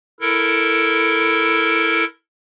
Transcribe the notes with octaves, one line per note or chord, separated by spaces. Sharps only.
E4 A4 A#4